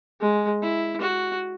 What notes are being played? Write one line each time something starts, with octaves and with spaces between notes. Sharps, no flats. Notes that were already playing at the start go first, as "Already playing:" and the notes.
G#3
E4
F#4